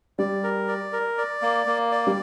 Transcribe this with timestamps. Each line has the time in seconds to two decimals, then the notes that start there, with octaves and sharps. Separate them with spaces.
0.19 G3 D5
0.44 A#4
0.68 D5
0.93 A#4
1.18 D5
1.42 A#3
1.67 A#3
1.92 D5
2.07 G3